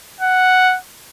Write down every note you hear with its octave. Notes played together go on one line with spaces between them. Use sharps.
F#5